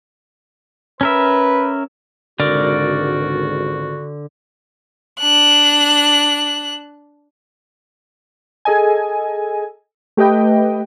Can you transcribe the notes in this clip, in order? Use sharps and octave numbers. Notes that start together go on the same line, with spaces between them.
C#4 A#4 B4 E5
G#1 C#2 D3 F#4 A#4 D5
D4 F#6
G#4 A4 D#5 G#5
A3 G4 B4 D#5 G5